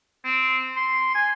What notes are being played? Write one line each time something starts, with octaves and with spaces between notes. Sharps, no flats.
C4
C6
G#5